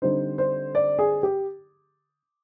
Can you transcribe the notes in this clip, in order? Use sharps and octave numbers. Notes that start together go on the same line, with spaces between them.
D3 G3 C4 D#4 C5
C5
D5
G#4
G4